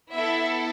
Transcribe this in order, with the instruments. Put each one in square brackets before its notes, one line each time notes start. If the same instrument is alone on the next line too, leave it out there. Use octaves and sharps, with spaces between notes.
[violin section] B3 E4 A4 E5